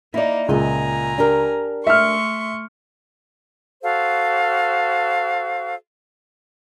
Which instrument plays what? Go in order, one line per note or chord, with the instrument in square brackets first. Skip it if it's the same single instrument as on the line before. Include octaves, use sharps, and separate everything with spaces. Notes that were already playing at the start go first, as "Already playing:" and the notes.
[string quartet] A#3 D#4 [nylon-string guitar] E4 D5
[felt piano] C#2 [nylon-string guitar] A#2 D#5 E5 [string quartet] G#5 A#5
[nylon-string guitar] D4 G4 A#4
[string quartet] A3 C6 C#6 [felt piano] E5 F6
[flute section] F#4 A4 C5 F5